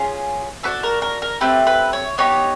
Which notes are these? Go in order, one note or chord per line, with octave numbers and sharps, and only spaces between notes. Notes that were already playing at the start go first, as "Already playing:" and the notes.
Already playing: C#4 F4 G#4
D4 F#4 A4 B4
A#4
A#4
A#4
A3 C4 G4 B4
B4
C#5
B3 D#4 G4 C#5